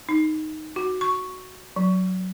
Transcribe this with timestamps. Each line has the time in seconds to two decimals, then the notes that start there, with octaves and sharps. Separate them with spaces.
0.09 D#4
0.76 F#4
1.01 C#6
1.76 F#3